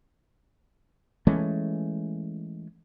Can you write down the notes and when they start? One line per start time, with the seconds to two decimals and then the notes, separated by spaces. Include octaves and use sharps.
1.27 E3 G#3 A3 C#4